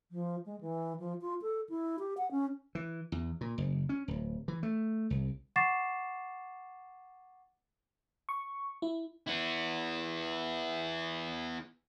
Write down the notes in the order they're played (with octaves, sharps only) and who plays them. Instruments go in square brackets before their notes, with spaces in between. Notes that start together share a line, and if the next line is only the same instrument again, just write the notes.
[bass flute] F3
G#3
E3
F3
F4
A4
E4
G4
F#5
C#4
[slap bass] E3
E2
A#2
F#1
C#4
D1
E3
A3
C2
[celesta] F#5 C#6 D6 A6 C7 E7
[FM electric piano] C#6
E4
[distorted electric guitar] B3 E4